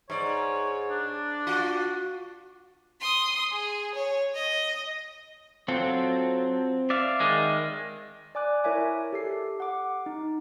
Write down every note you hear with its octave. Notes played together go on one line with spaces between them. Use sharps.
G#2 C#5 D5
D4
F4 F#4
C6 D#6
G#4
C#5
D#5
F#3 C4 F4 A4
D5 E5 F5
D#3 G#3
D5 G#5 D6 F#6
E4 A#4 C#5 E5 G#5 D6
G4 A4 C7
F#5 D6
D#4